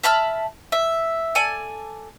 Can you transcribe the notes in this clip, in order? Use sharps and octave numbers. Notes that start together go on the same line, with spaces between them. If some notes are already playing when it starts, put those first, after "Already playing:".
E5 A5 B5 F6
E5
A4 D5 G#5